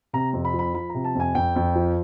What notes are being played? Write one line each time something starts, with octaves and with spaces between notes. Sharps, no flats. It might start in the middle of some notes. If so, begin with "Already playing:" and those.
C3 A#5
F2
B5
F3
B5
F3 B5
C3 A#5
A5
F2 G#5
F2 G5
F2
F3